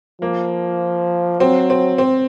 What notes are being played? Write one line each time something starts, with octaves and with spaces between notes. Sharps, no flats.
F3 A#3
F#3 C4
C4
C4